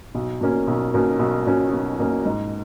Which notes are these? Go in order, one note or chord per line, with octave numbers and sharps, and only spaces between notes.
B1
B2 A#3 C#4
B1
B2 A#3 C#4
B1
B2 A#3 C#4
B1
B2 A#3 C#4
G#2